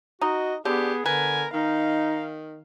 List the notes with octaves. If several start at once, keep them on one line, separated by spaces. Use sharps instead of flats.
D#4 F#4 D#5
D3 B3 G4 G#4
D3 A#4 B4 G#5
D#3 D#4 F5